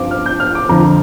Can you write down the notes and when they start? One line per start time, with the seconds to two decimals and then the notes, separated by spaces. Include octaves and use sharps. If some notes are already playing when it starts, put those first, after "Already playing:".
Already playing: G2 F3 C4 F4 D6
0.11 F6
0.26 G6
0.40 F6
0.55 D6
0.69 F2 D3 F3 A#5